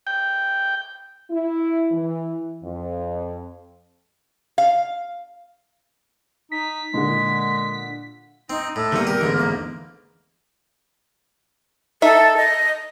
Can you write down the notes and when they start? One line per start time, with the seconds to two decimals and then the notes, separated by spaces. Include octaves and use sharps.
0.07 G5
1.30 E4
1.92 E3
2.63 F2
4.58 F5
6.52 D#4 B6
6.94 A#2 D3 G#3
8.50 C4 D#4
8.76 A2 A4
8.92 C3 D#3 G3 A#3 B3
9.07 G4 A#4
9.21 A1 E2 G#2 D3
9.38 A#3
12.02 D#4 A4 E5
12.37 D#5